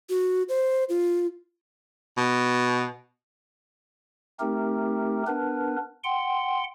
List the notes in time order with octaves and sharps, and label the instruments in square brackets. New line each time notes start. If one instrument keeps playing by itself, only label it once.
[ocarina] F#4
C5
F4
[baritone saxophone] B2
[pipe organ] A3 C4 D#4 G4 A#4
B3 D4 A#4 B4
F#5 G5 C6